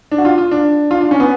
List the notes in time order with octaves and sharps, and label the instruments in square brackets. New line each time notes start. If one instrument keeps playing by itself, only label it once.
[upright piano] D4
F#4
F4
F4
D4
F4
D4
C#4
B3